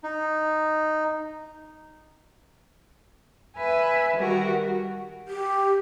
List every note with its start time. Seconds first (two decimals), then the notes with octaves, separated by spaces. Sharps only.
0.03 D#4
3.57 B4 E5 G#5
4.16 D#3 G3 F#4 A#4
5.28 G4